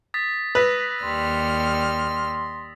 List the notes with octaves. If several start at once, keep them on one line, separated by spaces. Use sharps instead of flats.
D#6 A6 B6
B4 D#6 E6 A#6
D#2 G3 C6 F6